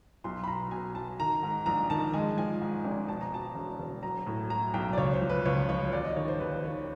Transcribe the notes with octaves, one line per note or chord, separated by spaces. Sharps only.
B1 C6
B5
B2 A#5
B2 G#5
F#3 A5
D#3 A#5
G#2
A#1 A#5
D#3 A5
G#3 G#5
F3 G#5
G#2
G#1
B2 A5
A#5
B2 A5
E1
E1
F#3 A#5
A2
F#3 A#5
B1 G5
D5
C#2 C#5
C5
F3
B4
C#2 C#5
F3 C#5
D#2 D5
D#5
D#3 C#5
C5
D#2 B4
D#3 C#5